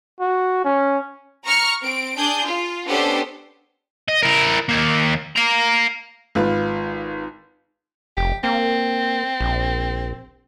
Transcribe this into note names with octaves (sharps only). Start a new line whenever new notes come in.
F#4
C#4
A#5 C#6 F6 C#7
C4 D7
D4 G#4 G6
F4
B3 C#4 D4 G4 A4 C5
D#5
E4 A#4
D#2 A#3
F5 A#5
G#1 F4 B4
F1 G4
A#3 C4
A#1